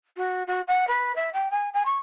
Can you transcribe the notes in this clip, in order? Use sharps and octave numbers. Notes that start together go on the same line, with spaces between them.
F#4
F#4
F#5
B4
E5
G5
G#5
G#5
C#6